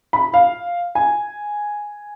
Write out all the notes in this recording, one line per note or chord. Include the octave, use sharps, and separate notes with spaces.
B5
F5
G#5